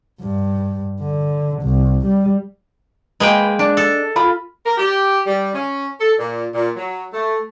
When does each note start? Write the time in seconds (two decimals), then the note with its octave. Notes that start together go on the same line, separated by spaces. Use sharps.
0.21 G2
1.01 D3
1.62 C2
2.06 G3
3.20 G#3 A#3 B4 G5
3.59 D4
3.77 A4
4.16 F4 B5
4.66 A#4
4.77 G4
5.26 G3
5.55 C#4
6.00 A4
6.19 A#2
6.54 A#2
6.76 F#3
7.14 A3